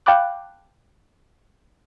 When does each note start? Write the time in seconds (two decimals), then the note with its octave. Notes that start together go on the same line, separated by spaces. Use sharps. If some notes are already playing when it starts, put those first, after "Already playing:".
0.06 F5 G5 A5 B5 D6 F#6